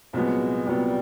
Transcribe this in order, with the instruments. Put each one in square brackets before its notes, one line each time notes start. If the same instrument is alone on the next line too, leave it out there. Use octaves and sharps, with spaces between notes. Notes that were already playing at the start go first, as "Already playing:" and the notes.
[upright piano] C2 A#2 F#3 B3 [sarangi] G#3
[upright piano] C2 A#2 F#3 B3 [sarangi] G3